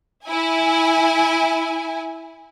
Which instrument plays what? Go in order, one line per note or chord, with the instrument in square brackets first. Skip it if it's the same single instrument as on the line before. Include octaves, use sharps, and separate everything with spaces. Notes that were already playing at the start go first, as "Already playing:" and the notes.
[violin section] E4 G#5